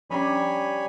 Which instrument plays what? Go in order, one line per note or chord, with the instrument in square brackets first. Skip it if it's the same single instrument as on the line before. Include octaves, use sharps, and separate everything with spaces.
[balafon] F3 C#4 D4 [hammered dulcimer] G3 A#5 [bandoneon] C#5 G#5 B5